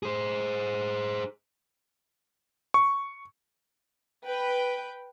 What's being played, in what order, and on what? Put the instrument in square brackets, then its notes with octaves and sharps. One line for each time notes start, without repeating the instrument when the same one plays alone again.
[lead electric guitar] G#4 C5
[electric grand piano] C#6
[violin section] B4 G5